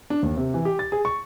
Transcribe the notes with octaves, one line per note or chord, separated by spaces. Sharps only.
D4
D#2
C3
E3
G4
A6
G#4
C#6